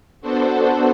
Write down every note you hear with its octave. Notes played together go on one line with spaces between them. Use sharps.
B3 D4 F#4 A4 C5